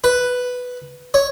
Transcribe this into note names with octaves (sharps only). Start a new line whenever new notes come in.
B4
C#5